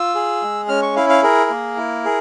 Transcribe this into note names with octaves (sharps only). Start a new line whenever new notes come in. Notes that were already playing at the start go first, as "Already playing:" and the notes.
Already playing: F4 E6
G#4
G#3
C#4 F6
C#6
E4 F5
F5
G#4 A#4
A#3
E4
G#4